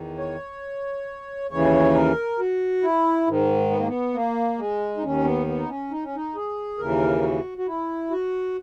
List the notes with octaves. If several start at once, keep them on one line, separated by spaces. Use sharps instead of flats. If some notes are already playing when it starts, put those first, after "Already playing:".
Already playing: E2 D#3
C#5
D#2 C#3 E3 C#5
A#4
F#4
E4
G#2 D#3
B3
A#3
B3
A#3
G#3
D#4
D#2 D#3 C#4
B3
B3
D#4
C#4
D#4
C#4
D#4
G#4
D#2 C#3 E3 A#4
F#4
F#4
E4
F#4